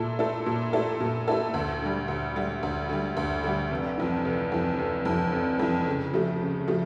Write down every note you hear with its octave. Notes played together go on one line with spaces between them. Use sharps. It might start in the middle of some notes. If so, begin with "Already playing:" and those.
Already playing: A#2 A3 E4 A4
A3 E4 A4
A#2
A3 E4 A4
A#2
A3 E4 A4
D2
D3 G3
D2
D3 G3
D2
D3 G3
D2
D3 G3
F1
F2 E3
F1
F2 E3
F1
F2 E3
F1
F2 E3
C#3
F3 A3
C#3
F3 A3